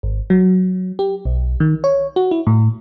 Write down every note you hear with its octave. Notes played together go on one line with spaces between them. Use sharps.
G#1
F#3
G4
B1
D#3
C#5
F#4
E4
A2